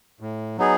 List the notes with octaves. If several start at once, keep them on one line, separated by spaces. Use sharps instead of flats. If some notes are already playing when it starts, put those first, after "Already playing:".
A2
F#3 B3 D#4 G#4